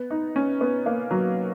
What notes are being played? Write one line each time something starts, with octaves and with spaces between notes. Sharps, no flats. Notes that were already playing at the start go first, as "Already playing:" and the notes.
Already playing: B3
D#4
C#4
B3
A#3
F#3